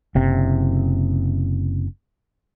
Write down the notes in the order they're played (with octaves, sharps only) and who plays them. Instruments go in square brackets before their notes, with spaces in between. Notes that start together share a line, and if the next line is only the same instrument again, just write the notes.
[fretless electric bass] F#1 C3